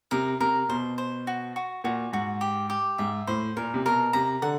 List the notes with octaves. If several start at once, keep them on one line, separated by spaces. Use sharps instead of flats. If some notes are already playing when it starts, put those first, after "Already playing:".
C3 A#4
C3 A#4
B2 C5
C5
F#4
F#4
A#2 F#4
G#2 F#4
G4
G4
G#2 E5
A2 C5
A#2 A#4
C3
B2 A#4
C3 A#5
D3 F#5